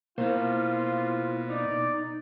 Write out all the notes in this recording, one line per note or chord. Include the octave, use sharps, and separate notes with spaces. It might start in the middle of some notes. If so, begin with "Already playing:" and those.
B2 A#3 E4 F4 C5
D#4 D5